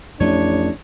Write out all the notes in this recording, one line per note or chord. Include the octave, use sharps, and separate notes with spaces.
A1 F2 A3 D4 C#5